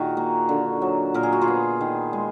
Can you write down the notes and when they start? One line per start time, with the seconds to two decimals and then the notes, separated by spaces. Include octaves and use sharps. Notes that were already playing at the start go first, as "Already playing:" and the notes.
Already playing: A#2 D#3 F#4 G#4 A#4
0.17 A#3
0.49 D3
0.82 F#3
1.14 A#2 A#4
1.23 G#4
1.32 F#4
1.42 F4 G#4
1.48 B3
1.81 D#3
2.13 G#3